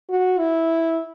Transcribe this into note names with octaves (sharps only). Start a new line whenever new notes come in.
F#4
E4